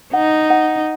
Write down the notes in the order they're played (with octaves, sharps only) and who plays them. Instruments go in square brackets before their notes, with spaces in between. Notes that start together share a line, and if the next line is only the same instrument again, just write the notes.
[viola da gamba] D#4 [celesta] F#5
[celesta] F#5